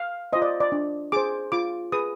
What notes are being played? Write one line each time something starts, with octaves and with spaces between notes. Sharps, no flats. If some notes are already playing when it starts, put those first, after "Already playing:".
Already playing: F5
F4 C5 D#5
D5
D5
D4
G#4 C5 D6
F4 D6
G#4 B4 D#6